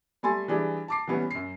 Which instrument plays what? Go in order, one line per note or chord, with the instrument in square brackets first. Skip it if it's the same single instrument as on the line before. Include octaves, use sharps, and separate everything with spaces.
[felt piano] G3 A3 G#5 C6 A6
E3 G3 D4 G#4
A5 D6 C7
E3 G3 B3 C#4
F#2 C7